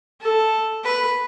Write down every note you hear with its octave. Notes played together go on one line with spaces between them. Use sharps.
A4
B4